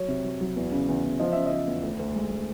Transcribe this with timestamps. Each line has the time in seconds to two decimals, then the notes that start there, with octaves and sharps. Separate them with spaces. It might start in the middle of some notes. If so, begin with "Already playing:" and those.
Already playing: F#3 C#5
0.08 C3
0.24 F#3
0.41 F#3
0.56 E2
0.72 C#3
0.88 E2
1.03 E2
1.20 F3 D#5
1.33 C#3 E5
1.46 F3 D#5
1.67 E2
1.83 D2
1.99 D2
2.15 G#3
2.31 G#3